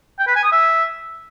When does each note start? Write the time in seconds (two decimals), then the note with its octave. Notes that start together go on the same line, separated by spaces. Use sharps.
0.19 G5
0.27 B4
0.35 G#5
0.44 D#6
0.52 E5